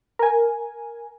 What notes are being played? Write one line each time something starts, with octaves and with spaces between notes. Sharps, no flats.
A#4 G#5